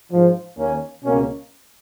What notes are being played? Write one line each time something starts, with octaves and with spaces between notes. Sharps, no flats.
G#2 F3
D#2 D#3 A#3 C#4
C#2 B2 A#3 C#4